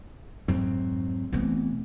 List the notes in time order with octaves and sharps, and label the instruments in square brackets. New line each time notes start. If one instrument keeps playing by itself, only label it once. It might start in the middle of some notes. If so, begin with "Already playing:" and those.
[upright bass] F2 [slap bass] G#2 F#3 C4
[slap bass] B2 E3 [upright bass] A3 C4